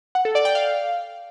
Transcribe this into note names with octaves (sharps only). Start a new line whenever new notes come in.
F#5
A4
D5
G5
F5